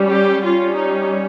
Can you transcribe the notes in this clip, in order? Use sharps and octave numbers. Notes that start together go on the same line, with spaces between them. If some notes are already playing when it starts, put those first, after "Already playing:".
Already playing: G3 C#4
G4
G3 C#4 F4
D#4